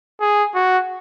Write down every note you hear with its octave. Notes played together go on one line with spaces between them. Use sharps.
G#4
F#4